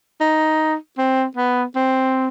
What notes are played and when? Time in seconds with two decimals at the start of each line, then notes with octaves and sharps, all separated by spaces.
0.21 D#4
0.98 C4
1.37 B3
1.76 C4